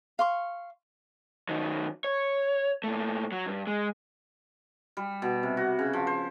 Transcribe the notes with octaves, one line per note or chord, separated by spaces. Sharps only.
F5 C6 C#6
D#3 F#3
C#5
A#2 A3
F#3
G2
G#3
G3
B2
C3
F#4
C#3
F3
C5